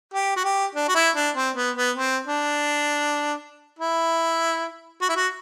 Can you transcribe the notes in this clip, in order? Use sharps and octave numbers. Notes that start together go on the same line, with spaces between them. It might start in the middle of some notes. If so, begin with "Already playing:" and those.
G4
F#4
G4
D4
F#4
E4
D4
C4
B3
B3
C4
D4
E4
F#4
E4
F#4